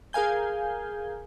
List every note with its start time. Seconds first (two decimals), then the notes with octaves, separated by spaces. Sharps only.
0.13 G#4 A#4 F5 G#5 G6